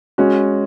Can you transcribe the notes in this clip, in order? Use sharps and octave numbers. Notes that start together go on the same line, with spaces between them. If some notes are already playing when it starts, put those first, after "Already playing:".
G#3 C#4 F#4